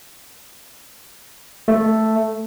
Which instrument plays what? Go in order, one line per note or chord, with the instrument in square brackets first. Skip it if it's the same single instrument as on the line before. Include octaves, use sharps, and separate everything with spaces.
[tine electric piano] A3